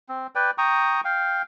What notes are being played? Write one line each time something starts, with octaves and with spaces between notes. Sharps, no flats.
C4
B4 D5 G5
G5 A#5 C#6 D#6
F5 G5